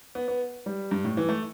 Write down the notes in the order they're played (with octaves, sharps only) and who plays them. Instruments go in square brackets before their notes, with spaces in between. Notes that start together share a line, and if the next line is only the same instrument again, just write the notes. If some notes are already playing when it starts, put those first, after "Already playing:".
[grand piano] B3
B3
G3
G2
A2
E3
A3